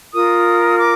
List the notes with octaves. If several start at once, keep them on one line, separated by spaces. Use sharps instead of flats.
F4 A#4 D#6
D6